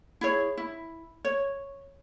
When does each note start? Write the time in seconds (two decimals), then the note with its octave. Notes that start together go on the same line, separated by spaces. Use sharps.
0.21 E4 G#4 C#5
0.57 E4
1.25 C#5